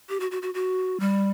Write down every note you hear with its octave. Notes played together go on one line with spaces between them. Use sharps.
G4
F#4
F#4
F#4
F#4
G3